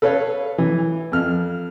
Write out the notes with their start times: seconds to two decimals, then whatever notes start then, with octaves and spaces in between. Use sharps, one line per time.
0.02 A4 B4 C#5 F5
0.58 E3
1.12 F2 F6